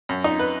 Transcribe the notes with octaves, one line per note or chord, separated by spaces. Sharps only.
F#2
D#4
B4